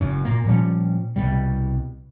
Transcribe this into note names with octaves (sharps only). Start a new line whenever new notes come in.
F#1 F#2
A#2 A#3
A#2 F3 G3 C#4
C2 B2 G3